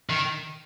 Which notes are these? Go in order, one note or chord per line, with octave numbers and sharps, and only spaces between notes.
D#3